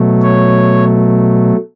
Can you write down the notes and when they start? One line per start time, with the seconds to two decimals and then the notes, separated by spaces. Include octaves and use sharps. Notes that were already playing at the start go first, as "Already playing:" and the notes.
Already playing: B2 F#3 A3
0.22 C#5